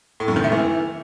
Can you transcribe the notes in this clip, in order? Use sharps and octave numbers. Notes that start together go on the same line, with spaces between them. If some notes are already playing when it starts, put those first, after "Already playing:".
A2
F#2
D#3
A3
E3